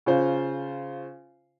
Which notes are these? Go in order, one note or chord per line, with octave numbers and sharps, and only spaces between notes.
C#3 F4 C5